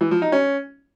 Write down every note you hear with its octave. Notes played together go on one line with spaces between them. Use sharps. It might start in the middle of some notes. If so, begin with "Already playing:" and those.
E3
F3
D#4
C#4